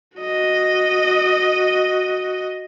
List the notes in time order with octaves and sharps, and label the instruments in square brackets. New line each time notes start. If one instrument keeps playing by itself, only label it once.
[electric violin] F#4 D#5